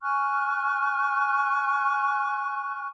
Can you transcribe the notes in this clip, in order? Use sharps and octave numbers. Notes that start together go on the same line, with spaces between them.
G#5 C#6 F6 F#6